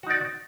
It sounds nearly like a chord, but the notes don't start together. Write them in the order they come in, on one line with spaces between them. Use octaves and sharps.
F#4 D#4 D5